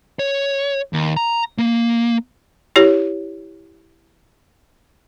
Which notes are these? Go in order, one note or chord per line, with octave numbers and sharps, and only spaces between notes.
C#5
D#2
A#5
A#3
E4 G4 C#5